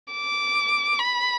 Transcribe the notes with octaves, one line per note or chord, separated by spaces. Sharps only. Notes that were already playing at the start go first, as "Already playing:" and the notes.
D6
B5